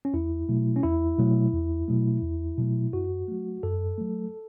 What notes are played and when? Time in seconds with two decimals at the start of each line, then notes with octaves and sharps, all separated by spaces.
0.05 C#4
0.14 E2 E4
0.49 B2 F#3 A3
0.76 C#4
0.83 E2 E4
1.18 B2 F#3 A3
1.54 E2
1.88 B2 F#3 A3
2.23 E2
2.58 B2 F#3 A3
2.93 F#2 F#4
3.28 F#3 A3
3.63 F#2 A4
3.98 F#3 A3